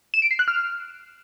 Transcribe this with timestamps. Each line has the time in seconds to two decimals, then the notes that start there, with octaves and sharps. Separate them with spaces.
0.14 E7
0.22 D7
0.31 C7
0.39 F#6
0.48 F6